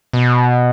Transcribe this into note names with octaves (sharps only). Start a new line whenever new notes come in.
B2